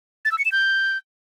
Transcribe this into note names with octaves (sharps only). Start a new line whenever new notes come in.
A6
E6
C#7
E7
G6